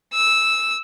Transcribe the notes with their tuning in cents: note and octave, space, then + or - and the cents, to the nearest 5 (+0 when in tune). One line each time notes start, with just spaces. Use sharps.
E6 -10